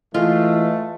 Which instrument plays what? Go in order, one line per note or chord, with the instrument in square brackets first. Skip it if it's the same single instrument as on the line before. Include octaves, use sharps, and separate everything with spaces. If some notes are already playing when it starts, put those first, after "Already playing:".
[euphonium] E3 [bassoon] G#3 [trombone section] A3 [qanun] F4